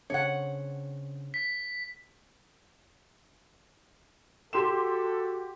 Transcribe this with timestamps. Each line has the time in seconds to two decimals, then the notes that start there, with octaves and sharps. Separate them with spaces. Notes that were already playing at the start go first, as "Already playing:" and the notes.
0.10 C#3 C4 D4 C#5 F#5
1.34 B6
4.53 F#4 G4 A4 C6 E7